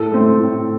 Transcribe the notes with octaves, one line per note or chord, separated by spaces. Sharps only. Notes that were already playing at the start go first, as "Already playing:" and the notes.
Already playing: A2 A4
A3 C4
A2